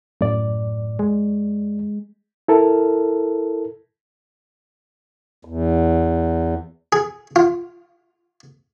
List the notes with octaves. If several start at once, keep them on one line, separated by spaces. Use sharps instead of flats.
F#2 A2 D5
G#3
E4 A4 A#4
E2
G#4
F4